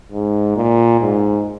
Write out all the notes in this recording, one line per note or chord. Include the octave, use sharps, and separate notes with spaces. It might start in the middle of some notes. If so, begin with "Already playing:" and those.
G#2
A#2
G#2